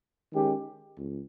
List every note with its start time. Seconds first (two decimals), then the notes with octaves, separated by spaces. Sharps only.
0.33 D#3 G#3 C#4 G4
0.97 C#2